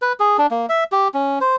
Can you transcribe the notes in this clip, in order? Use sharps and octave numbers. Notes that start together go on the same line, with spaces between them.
B4
G#4
D4
A#3
E5
G4
C#4
C5